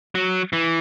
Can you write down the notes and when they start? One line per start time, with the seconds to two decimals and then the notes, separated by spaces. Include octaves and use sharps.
0.15 F#3
0.53 E3